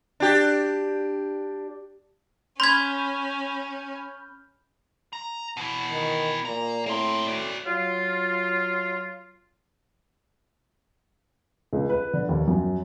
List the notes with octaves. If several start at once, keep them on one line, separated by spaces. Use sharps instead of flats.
D4 G4
C#4 B5 C6 F6 G6 G#6
A#5
B2 E3
D#3
A#2 A#3 A#5
A2 A#3 C4
F#4 D5
F#3 F4
C#2
B4
D3
D#2
F#2